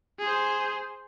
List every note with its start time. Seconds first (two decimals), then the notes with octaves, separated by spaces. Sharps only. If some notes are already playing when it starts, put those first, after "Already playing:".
0.19 G#4 C5